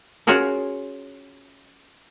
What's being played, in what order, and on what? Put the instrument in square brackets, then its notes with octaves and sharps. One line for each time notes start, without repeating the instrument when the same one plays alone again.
[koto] C#4 F4 F#4 G#4 A#4